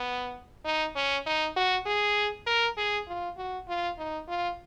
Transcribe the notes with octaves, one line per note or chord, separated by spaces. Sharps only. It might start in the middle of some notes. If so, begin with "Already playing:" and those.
Already playing: B3
D#4
C#4
D#4
F#4
G#4
A#4
G#4
F4
F#4
F4
D#4
F4